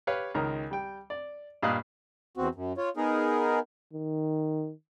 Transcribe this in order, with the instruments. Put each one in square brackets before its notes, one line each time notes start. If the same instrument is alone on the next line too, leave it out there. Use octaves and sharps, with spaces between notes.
[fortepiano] G4 B4 C#5 F5
C#2 D#3 A#4 D#5 A#5
G3 G5
D5
G2 A#2 D#5 F5 D#6 F#6
[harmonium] E2 C4 F#4
F#2
F4 C#5
B3 D#4 G#4 A#4
[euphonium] D#3